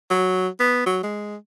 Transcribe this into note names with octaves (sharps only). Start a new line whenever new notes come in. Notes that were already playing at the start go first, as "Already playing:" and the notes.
F#3
B3
F#3
G#3